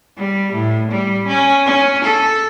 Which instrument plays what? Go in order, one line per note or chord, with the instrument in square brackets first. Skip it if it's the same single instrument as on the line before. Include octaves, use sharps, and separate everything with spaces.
[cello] G3
A2
G3
C#4
C#4
A4